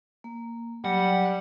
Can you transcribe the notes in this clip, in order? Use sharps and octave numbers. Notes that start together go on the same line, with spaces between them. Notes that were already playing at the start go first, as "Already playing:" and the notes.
A#3
F#3 G3 F#5